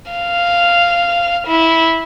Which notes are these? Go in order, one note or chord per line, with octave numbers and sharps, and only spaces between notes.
F5
E4